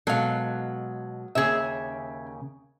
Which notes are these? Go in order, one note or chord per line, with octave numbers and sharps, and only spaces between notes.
B2 F#3 G#3 A4 F5
D#2 C#3 G#4 E5